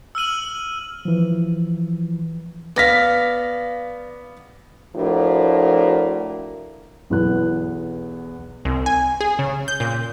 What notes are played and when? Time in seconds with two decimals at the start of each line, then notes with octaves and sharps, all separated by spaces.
0.15 E6 F6 D#7 F#7
1.05 E3 F3
2.76 B3 D5 F5 A#6 B6
4.96 A2 F3 D4 F#4 A#4
7.10 B1 E2 B3 F#6
8.65 C2
8.86 G#5
9.21 G#4
9.39 C#3
9.68 G6
9.80 A#2